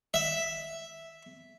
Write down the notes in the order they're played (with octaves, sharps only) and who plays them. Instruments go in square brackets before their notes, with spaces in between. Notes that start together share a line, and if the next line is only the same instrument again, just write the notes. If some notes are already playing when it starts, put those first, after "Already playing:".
[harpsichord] E5